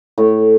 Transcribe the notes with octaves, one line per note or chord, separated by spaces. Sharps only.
A2